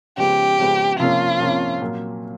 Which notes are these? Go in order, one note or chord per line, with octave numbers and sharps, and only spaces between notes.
C#3 F3 G#3 B3 G4
C#3 F3 G#3 B3
C3 F3 A#3 C#4 F4
C3 F3 A#3 C#4
A#2 F#3 A#3